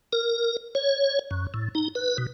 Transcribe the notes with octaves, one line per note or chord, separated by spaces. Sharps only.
A#4
C#5
F#2
A2
D#4
B4
B2